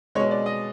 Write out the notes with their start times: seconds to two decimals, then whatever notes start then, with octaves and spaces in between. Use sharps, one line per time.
0.15 G#3 C#5
0.19 B2
0.31 D5
0.46 D#5